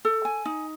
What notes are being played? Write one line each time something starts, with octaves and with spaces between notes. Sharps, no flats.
A4
G#5
D#4